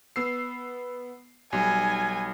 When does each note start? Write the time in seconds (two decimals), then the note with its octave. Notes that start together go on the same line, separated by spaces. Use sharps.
0.16 B3 E6 C7
1.53 B1 G3 G#5